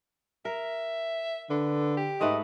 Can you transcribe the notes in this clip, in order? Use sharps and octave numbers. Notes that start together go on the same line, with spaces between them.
A#4 E5
D3 B4
G4
G#2 A3 B4 D#5